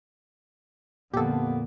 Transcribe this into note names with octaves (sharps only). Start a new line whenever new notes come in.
F2 A#2 D3 A#3 B3 G4 A4